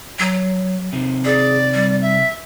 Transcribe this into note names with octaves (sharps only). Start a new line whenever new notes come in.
F#3
C3 D#3 C4
G#4 D5
G3
E5